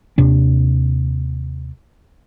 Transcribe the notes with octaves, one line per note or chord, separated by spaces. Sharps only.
D#2 C3 D4